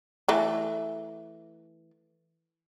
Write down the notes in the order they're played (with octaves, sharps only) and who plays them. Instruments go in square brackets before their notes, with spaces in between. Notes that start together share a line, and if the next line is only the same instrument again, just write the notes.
[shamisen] E3 A3